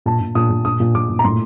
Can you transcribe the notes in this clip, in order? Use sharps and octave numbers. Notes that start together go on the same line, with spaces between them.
A#2 A5
A#2
A#2 D#6
A#2
A#2 D#6
A#2
A#2 D6
A#2
A#5
A2 C6